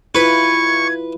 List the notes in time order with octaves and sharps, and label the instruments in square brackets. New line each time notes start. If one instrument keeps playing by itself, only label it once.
[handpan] E4 F4 [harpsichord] B4 [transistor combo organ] C#6 [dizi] G#6